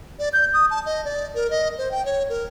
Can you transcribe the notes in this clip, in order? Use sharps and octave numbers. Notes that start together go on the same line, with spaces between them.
D5
G6
D#6
A5
D#5
D5
A#4
D#5
C5
G5
C#5
A#4